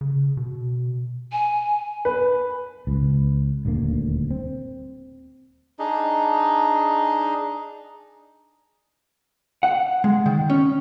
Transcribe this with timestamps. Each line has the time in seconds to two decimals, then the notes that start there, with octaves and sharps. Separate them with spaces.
0.01 C#3
0.37 B2
1.32 G#5
2.05 B4
2.87 C#2
3.65 D#1 D2 D3 A#3
4.31 C4
5.79 D4 D#4 G#4 D#5
9.63 F#5
10.04 G#3
10.26 D#3
10.50 C#4